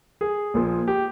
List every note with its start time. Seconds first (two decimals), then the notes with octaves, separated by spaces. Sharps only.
0.21 G#4
0.54 A#1 A#2 F3
0.88 G4